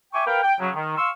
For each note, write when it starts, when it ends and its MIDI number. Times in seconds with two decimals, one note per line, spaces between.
0.14 0.25 76
0.14 0.25 79
0.14 0.25 80
0.14 0.25 85
0.14 0.25 86
0.27 0.39 70
0.27 0.39 71
0.27 0.39 77
0.27 0.39 79
0.43 0.55 79
0.60 0.70 49
0.60 0.70 54
0.75 0.96 51
0.97 1.10 77
0.97 1.10 84
0.97 1.10 85
0.97 1.10 88